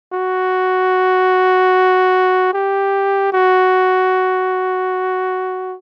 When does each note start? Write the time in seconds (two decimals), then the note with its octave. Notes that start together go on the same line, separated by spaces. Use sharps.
0.14 F#4
2.54 G4
3.33 F#4